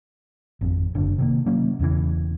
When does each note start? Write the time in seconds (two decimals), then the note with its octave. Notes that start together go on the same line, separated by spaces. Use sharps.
0.61 G#1 F2
0.95 F#1 D3
1.18 C3 D#3 A#3
1.46 F#3 A#3 C#4
1.79 E1 E2 C#3 E3